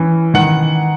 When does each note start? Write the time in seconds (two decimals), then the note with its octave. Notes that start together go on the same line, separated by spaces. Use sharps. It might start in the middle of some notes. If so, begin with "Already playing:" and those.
Already playing: E3 C#4
0.34 D#3 F#5